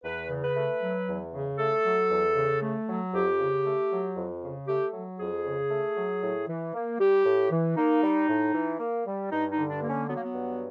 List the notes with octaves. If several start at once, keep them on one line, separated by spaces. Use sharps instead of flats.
E2 B4
C#3
B4
A3
F#3
E2
C#3
A3 A4
F#3
E2
C#3
A3
F#3
F2 G4
C#3
A3
F#3
F2
C#3
A3 G4
F#3
F2 G#4
C#3
A3
F#3
A2
E3
A#3
G3 G4
A2
E3
A#3 D#4
G3
A2
E3
A#3
G3
G2 D#4
D#4
D3
D4
A#3
C#4
F#3 B3
A#3
B3
G2